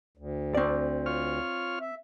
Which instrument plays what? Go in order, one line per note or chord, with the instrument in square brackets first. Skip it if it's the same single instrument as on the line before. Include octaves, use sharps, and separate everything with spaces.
[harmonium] D2
[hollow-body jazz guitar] C4 D5
[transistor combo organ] F4 C#5 F6
[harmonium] E5